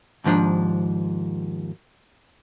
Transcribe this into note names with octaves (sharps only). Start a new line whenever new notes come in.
D#2 G#2 F3 D4 A#5